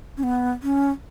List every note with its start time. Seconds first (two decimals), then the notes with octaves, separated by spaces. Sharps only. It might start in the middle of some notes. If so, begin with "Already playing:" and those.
0.17 C#4
0.23 B3
0.63 C#4